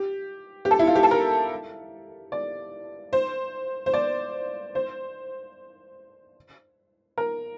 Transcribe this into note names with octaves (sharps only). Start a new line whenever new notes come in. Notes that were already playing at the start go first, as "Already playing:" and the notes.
Already playing: G4
G4
A4
E4
F4
G4
A4
A#4
D5
C5
C5
D5
C5
A#4